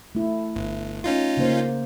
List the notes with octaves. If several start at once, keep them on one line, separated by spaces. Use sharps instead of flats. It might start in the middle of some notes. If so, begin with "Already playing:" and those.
A3 E4
G1
C#4 D#4 F4
C#3 A#3 C5